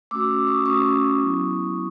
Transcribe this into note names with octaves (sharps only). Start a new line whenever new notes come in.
A3 C#4 F#4 D6 E6
C#6 D#6
A3 C#4 F#4 C#6 D#6
F#3 B3 E4